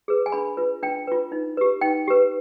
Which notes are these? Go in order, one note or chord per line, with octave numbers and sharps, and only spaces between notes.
G#4 B4
G#5
D4 B5
F4 B4
D4 G5
F4 B4
D#4
G4 B4
D#4 G5
G4 B4